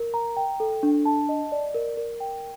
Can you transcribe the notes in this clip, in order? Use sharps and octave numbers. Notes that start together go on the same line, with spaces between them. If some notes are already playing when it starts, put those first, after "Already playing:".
Already playing: A#4
A#5
G5
A4
D4
A5
D#5
D5
A#4
A#4
G5